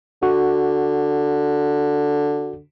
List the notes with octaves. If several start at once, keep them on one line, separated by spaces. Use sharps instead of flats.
D3 F#4